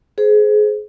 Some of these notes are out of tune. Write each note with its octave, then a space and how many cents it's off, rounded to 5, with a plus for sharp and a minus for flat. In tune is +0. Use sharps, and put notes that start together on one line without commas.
G#4 +25 C5 +0